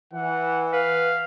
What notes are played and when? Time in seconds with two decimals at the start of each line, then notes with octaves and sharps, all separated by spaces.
0.13 E3 F#5
0.73 B4 F5